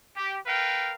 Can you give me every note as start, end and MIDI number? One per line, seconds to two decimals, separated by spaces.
0.17 0.38 67
0.47 0.95 70
0.47 0.95 71
0.47 0.95 77
0.47 0.95 79